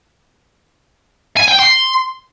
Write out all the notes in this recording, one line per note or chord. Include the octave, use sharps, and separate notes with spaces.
G#5
G5
C6